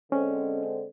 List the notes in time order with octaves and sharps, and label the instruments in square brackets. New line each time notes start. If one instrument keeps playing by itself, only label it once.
[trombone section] D3 G#3 C4 [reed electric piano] C#4